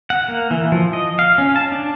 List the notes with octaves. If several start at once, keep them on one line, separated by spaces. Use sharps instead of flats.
F#5
A#3
E3
F3
D#5
F5
C#4
A5
D4